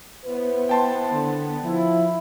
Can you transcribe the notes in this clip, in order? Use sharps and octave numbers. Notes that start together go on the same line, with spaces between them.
B3 E4 B4 C5
G5 A5 C6
D3
F3 E4